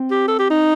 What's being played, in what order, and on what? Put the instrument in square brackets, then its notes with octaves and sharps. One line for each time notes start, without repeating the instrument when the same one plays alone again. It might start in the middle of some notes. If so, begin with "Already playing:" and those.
Already playing: [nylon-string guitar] C4
[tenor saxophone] G4
A4
G4
D#4